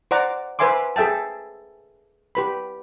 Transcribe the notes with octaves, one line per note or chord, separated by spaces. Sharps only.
C5 D5 F#5 A#5 D6
B4 C5 E5 G#5 C6 D6
G#4 A4 E5 G5 A5
G4 B4 B5